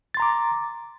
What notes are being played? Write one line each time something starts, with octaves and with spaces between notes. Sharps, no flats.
A#5 C6 D6 A6